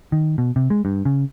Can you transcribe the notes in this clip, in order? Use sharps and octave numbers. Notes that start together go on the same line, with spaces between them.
D#3
B2
C3
G#3
G2
C#3